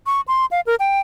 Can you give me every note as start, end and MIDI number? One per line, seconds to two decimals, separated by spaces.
0.06 0.21 85
0.28 0.46 84
0.51 0.61 77
0.67 0.75 70
0.80 1.00 79